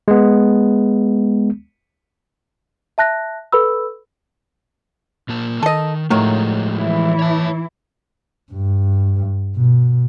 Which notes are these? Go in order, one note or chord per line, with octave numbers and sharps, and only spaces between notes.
G#3 B3
E5 A5 F#6 A#6
A4 B4 B5 E6
A#2 A#3 A5
D#3 A4 D#5
A2 D#3 F3 F#3 G#3
E3 E4
C#5 A5
G2
B2